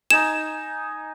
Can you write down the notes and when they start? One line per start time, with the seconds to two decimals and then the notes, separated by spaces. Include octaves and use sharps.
0.10 D#4 G#5 E7